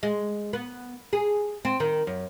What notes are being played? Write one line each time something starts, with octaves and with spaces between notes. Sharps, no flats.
G#3
B3
G#4
C4
D#3
F#2